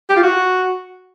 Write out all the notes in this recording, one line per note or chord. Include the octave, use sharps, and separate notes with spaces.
G4
F4
F#4